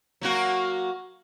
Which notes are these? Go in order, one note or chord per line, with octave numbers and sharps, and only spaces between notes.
F#3 A#3 F#4